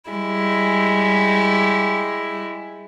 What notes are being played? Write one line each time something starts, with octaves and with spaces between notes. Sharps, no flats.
G3 G#3 E4